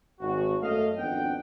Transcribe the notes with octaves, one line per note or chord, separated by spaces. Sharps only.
G#1 F#4
F#2 A3 D#5 F5
G#1 F2 B3 D4 F#5 G5